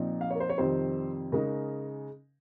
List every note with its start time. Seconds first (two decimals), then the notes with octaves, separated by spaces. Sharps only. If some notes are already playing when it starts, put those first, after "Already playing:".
Already playing: A#2 F3 C4 D#4
0.21 F5
0.31 C#5
0.35 A#4
0.40 C5
0.49 C#5
0.58 F2 C3 D#3 G3 C4 C5
1.32 C#3 G#3 D#4 A#4